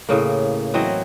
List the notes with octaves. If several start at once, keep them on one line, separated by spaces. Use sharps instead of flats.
A2 C#3 A#3
E3 F#3 C4 D#5